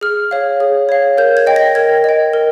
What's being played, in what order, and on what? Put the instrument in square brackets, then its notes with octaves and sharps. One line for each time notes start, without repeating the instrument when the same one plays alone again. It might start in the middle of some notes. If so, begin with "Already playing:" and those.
[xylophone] G#4 F6
C#5 F5
G#4
C#5 F5
A#4 G6
G#6
D#5 G5
A#6
A#4 G#6
D#5 G5
A#4